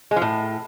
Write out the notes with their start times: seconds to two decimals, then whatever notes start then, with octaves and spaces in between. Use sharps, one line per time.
0.11 G#3
0.16 F3
0.22 A2